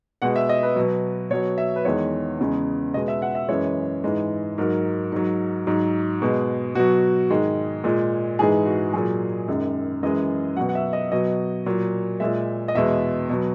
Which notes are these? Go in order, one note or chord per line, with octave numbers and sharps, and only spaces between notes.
B2 G#3 F#5
E5
D#5
B4
B2 F#3
B2 F#3 C#5
E5
B4
E2 D#3 G#3 C#5
E2 C#3 G#3
B2 G#3 D#5
E5
F#5
E5
F#2 E3 G#3 C#5
G#2 E3 G#3
G#2 F#3 A#4
G#2 F#3
G#2 F#3
B2 G#3
B2 F#3 F#4
G#2 D#3 G#3
A#2 G#3
G#2 E3 G#3 G#4
F#4
A#2 F#3 G#4
F#2 D#3 G#3
F#2 E3 G#3 D#5
B2 F#3 F#5
F#5
E5
D#5
B2 F#3 D#5
A#2 F#3
A#2 G#3 E5
D#5
E2 B2 G#3 E5
B2 F#3